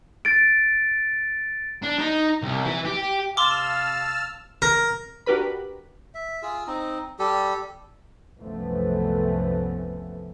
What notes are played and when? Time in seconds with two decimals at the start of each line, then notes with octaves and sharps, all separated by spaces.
0.25 A6 D7
1.83 D4
1.99 D#4
2.43 C2
2.64 E3
2.85 G4
3.37 C3 F5 A5 C6 D6 E6 F6
4.62 A#4
5.26 D4 F#4 G4 A#4 B4 B5
6.14 E5
6.42 F4 G#4 E6
6.67 C4 D#4
7.19 G3 G4 A4
8.39 C2 F#2 E3 F3 A3 B3